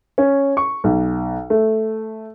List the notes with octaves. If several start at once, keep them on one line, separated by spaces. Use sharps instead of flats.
C#4
C#6
B1
A3